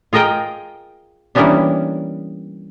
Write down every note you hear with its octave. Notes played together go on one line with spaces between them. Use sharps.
F4 G#4 A#4 D#5 G5
E3 G3 A#3 B3 C#4 D4